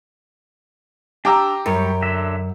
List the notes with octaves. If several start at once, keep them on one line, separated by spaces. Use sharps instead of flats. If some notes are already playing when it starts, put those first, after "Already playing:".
D4 G4 A#5 D6 E6
F#2 G3 C#5
D3 F#3 E5